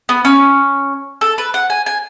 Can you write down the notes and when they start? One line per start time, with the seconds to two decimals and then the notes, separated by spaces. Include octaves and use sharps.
0.09 B3
0.25 C#4
1.21 A4
1.38 B4
1.54 F#5
1.70 G#5
1.86 G#5